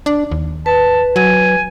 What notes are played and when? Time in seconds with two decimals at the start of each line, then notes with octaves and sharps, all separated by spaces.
0.06 D4
0.31 D#2
0.66 B4 A5
1.16 F#3 G#5